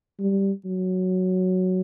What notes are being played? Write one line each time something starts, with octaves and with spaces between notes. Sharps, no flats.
G3
F#3